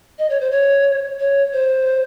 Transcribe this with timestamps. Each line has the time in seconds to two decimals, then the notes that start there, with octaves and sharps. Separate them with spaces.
0.18 D#5
0.30 C#5
0.40 C5
0.51 C#5
1.19 C#5
1.53 C5